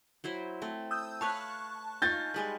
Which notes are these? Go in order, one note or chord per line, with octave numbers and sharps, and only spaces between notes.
F#3 E4 C5
A3 C4
D#6 E6 G6
B4 C#5 F5 A5 C#6 F#6
D#4 F4 G#5 G6 A6
G3 G#3 B4